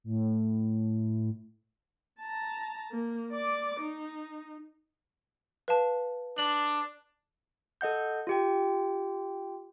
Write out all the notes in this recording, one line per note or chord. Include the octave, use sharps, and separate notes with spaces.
A2
A5 A#5
A#3
D5 D6
D#4
B4 F5 A5
D4 F#7
A4 D#5 F#5 G6
F4 G4 G5